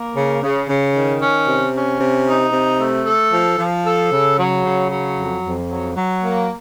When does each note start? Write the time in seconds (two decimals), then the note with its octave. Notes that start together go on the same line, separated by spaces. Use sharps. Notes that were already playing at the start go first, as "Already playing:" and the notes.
Already playing: A#3
0.16 C#3
0.43 C#3
0.69 C#3
0.95 D#3
1.21 C#4
1.48 C3
1.74 C#4
2.00 C3
2.27 D#4
2.53 C3
2.79 A3
3.06 A4
3.32 F3
3.58 F3
3.85 A4
4.12 C#3
4.38 F#3
4.64 C#3
4.90 F#3
5.17 F2
5.43 F2
5.70 F#3
5.96 F#3
6.23 A#3